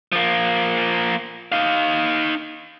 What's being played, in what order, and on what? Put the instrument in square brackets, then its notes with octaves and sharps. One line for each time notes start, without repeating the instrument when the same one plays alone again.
[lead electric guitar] F3 A#3
D#4 F5